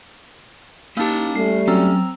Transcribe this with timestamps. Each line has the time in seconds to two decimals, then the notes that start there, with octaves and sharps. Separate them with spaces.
0.97 A#3 C#4 D#4 G4 A5
1.35 G3 A3 C7
1.68 F#3 C4 C#4 A#5 E6